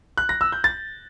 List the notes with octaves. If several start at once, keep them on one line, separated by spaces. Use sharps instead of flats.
F#6
A#6
E6
G6
A6